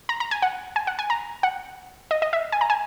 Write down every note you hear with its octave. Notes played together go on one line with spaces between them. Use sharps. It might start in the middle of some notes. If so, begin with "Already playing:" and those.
A#5
A#5
G#5
F#5
G#5
F#5
G#5
A#5
F#5
D#5
D#5
E5
G#5
A#5
G#5